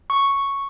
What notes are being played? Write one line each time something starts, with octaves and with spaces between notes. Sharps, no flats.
C#6